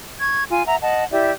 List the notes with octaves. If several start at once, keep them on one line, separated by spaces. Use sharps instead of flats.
C#6 G#6
F4 G#5
E5 F#5 A#5
D#5 F#5 A5
E4 G4 D5 E5